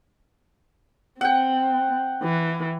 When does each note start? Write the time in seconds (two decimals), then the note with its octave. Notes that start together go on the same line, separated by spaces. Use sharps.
1.21 C4 F#5 G5
2.23 E3